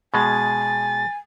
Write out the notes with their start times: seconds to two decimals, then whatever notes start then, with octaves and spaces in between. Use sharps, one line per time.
0.14 B2 G#3 G#5 A6